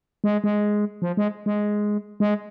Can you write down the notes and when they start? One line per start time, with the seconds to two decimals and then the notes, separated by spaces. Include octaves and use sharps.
0.24 G#3
0.44 G#3
1.02 F3
1.17 G#3
1.46 G#3
2.20 G#3